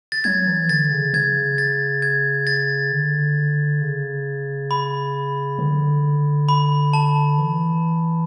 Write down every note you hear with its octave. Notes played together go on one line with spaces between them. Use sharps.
A6
F#3 G#6
E3
D3 A6
C#3
C#3 G#6
A6
G#6
A6
D3
C#3
B5
D3
B5
A5
E3